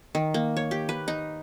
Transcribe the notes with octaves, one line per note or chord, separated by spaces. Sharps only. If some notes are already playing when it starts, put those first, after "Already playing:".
D#3
A#3
C#5
G4
B4
D#4